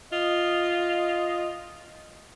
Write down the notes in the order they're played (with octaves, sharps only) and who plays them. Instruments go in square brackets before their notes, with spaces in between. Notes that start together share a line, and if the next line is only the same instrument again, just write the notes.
[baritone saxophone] F4 [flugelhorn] D#5